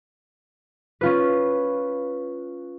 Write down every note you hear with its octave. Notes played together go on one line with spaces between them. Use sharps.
C#4 F4 B4